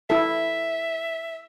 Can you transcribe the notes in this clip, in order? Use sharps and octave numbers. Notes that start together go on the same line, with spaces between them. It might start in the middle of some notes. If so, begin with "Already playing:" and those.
E4 A4 E5